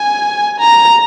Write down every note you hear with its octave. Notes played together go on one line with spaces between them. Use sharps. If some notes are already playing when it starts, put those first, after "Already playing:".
Already playing: G#5
A#5